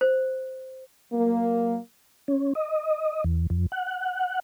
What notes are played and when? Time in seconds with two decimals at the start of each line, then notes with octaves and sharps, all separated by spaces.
0.01 C5
1.12 F#3 A#3
2.28 C#4
2.55 D#5
3.24 E2
3.50 F2
3.72 F#5